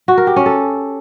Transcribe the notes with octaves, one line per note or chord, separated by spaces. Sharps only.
F#4
A#4
G4
C#4
A4